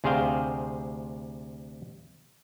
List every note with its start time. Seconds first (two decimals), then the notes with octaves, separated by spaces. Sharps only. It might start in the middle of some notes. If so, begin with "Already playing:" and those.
0.04 D2 C3 G#4 C5 F5 G5